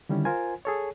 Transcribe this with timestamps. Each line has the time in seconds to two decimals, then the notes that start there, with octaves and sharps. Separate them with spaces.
0.09 D3 D#3 G3 C#4 E4
0.25 F4 A#4 C5 G#5
0.65 G#4 A4 C#5